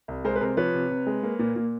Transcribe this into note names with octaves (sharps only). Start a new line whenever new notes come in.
C2
G#3 A#4 C5
B4
C3 A#4 C5
F3 B4 C#5
C3
C3
G#3
A#3
A#2
A#2